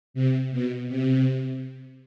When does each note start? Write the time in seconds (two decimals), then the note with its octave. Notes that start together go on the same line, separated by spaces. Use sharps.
0.14 C3
0.51 B2
0.88 C3